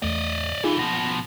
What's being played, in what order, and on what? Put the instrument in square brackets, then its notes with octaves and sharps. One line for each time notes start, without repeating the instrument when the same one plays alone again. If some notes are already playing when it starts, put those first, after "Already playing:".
[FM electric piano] E2 A3 [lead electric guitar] D5 D#5
[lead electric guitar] D3 E3 [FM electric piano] D#4 F4 G#4
[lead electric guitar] B2 F3 [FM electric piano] A#6